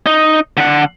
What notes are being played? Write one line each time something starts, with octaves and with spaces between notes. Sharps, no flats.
D#4
D3 F#5